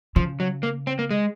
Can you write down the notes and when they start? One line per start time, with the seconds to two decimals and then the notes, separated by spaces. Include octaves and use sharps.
0.16 C#3 F3
0.40 F#3
0.63 A#3
0.87 C4
0.99 A#3
1.11 G#3